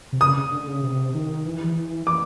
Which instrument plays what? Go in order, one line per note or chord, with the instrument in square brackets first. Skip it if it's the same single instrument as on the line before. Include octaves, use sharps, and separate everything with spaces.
[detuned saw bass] C3
[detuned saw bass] C#3 [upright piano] D#6
[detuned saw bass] C#3
D3
C#3
C3
D#3
E3
E3
[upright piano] D6